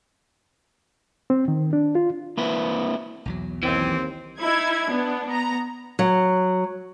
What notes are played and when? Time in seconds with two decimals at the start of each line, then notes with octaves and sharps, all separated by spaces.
1.30 C4
1.48 D#3
1.73 D4
1.95 F4
2.37 A#3 C4 E4 B4
3.26 B1 E2 F#3
3.63 D#2 E3 C4
4.39 D#4 E4 G#6
4.87 B3 D4
5.26 B3 A#5
5.99 F#3